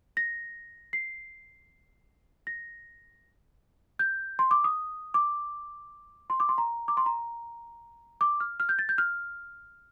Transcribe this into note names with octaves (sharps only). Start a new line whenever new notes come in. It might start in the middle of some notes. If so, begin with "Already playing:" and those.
A#6
C7
A#6
G6
C6
D6
D#6
D6
C6
D6
C6
A#5
D6
C6
A#5
D6
F6
F6
G6
A6
G6
F6